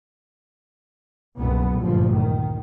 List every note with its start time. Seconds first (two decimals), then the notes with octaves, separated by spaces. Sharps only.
1.38 F#1 C2 F#2 B2 B3
1.79 F#1 D2 G2 A#2 F3
2.17 D#3